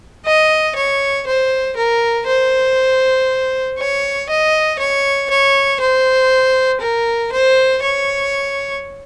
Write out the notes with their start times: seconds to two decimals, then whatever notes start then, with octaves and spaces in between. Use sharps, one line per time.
0.26 D#5
0.76 C#5
1.27 C5
1.76 A#4
2.27 C5
3.79 C#5
4.29 D#5
4.79 C#5
5.30 C#5
5.80 C5
6.81 A#4
7.32 C5
7.83 C#5